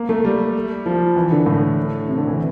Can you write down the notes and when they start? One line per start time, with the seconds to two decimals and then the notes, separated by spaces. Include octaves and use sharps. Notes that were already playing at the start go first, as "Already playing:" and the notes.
Already playing: A#3
0.09 A3
0.25 G3
0.86 F3
1.16 E3
1.31 D3
1.46 A2
2.07 C3
2.18 D3
2.28 E3